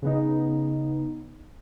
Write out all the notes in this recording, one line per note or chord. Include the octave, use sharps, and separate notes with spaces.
C#3 B3 D#4